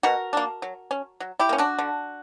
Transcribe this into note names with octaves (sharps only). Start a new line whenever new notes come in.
B2 F#4 A#4
A#3 D4
F#3
C#4
F#3
E4 G4
A#3 C#4
D4 F#4
D3